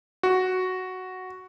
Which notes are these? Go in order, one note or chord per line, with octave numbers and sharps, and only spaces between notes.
F#4